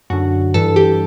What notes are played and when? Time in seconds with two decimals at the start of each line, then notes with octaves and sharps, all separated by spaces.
0.10 F#2 D3 F#4
0.54 G2 E3 A4
0.76 G4